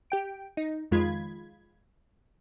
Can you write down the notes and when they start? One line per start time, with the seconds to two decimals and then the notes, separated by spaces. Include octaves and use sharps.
0.10 G4 G5 D7
0.57 D#4
0.91 F2 D#3 G#3 F4 B5 G#6